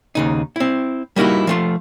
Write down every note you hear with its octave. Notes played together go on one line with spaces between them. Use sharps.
D#2 C#3 D#4
C4 E4
G3 A#3 D#4 E4 F#4
F3 A3 F4